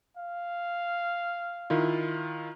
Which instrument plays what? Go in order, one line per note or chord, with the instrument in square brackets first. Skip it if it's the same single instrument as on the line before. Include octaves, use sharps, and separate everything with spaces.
[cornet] F5
[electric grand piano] D#3 E4 F4